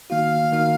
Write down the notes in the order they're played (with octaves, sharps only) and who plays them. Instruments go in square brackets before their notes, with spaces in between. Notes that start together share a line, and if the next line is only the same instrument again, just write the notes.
[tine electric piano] D#3 A#3 D#4 F#4 [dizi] F5
[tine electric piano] D#3 A#3 D#4 F#4